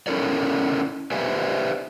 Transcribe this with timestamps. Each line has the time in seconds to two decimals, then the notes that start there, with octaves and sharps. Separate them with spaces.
0.07 C#4 E4 A4 A#4 C#5 D5
1.12 G4 B4 C5 D5 E5 G#5